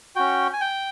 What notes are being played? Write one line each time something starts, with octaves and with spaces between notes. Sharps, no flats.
C#4 F#4 G5
G#5
G5